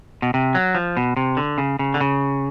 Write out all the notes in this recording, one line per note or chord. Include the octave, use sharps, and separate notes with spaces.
B2
C3
F#3
F3
B2
C3
D3
C#3
C#3
D3
C#3